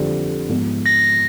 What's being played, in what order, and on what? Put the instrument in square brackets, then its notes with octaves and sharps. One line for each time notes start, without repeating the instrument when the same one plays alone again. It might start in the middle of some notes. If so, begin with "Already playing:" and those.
Already playing: [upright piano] F2 D3 G3 C4
G#2 F3 G#3 B3
[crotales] A#6